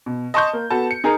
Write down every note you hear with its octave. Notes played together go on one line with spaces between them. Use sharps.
B2
D#5 A5 C6 C#6 D#6 G6
A#3
B3 F#4 A4 A5
C#7
D#4 G#4 A#4 A#5